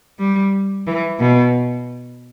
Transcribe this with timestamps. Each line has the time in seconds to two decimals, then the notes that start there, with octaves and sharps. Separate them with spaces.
0.19 G3
0.87 E3
1.19 B2